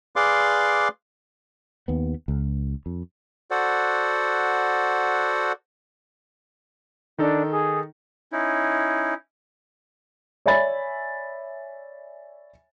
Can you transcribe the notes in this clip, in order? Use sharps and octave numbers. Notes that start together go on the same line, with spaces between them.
G#4 B4 D5 F5 C6 D6
D#2 B3
C#2
F2
F#4 A4 C5 D5 F#5
D#3 D4 D#4 A4
G#4
C#4 D#4 E4
C#5 D5 E5 G#5 B5 A6